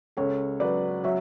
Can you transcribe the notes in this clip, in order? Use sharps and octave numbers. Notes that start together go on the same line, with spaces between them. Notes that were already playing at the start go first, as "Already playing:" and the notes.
C#2 A4 C#5
F#3 B4 D5
F#3 C#5 E5